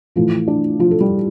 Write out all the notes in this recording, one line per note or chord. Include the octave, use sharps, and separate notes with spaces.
A2 E3 F3 A3 F4
D4
F3 F4
A4
G3 G4